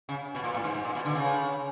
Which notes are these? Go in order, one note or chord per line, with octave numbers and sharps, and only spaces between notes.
C#3
B2
A#2
A2
G#2
G#2
A#2
B2
D3
C#3